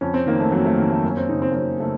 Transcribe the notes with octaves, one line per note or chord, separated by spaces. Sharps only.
F2 C#4
C4
D#3 A#3
A3
F2 F#3
A3
D#3 A#3
A3
F#2 A#3
C#4
C4
C#3 D#4
C4
A#3
F#2 C4
C#3 A3